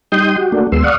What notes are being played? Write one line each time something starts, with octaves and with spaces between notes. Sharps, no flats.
G3 D#4 G5 C6 D#6 G6
F#4 G4
A3 A#3 D4 F#4
D#2 G#3 B3 C6 E6
D5 F5 F#5 C#6 D#6